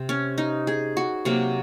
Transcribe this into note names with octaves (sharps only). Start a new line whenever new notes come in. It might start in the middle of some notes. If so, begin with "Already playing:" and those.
Already playing: C3
C#4
D#4
G#4
F#4
C3 F#3 A#3